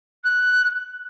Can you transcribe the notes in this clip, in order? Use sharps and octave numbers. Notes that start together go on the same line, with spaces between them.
F#6